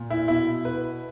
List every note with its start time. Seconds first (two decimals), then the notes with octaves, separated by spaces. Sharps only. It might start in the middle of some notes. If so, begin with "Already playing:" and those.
Already playing: A#2
0.10 E4
0.28 B2 E4
0.65 B4